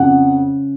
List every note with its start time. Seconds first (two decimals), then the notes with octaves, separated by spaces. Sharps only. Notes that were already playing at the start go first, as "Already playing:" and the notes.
Already playing: F2 C#3 F#5